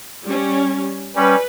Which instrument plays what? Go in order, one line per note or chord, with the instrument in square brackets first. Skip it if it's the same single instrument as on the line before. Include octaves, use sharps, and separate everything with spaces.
[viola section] G3 C#4
[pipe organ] G3 C#4 [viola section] B4